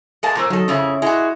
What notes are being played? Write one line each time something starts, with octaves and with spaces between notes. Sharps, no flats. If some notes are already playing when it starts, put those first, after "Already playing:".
G#3 A#3 A5
A#2 F#3 C4 A#4
D#3 F#3 A4
F2 C#3 C#4 E4
G#3 E4 F#4